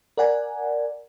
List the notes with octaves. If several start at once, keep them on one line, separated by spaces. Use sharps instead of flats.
A#4 D5 F#5 G#5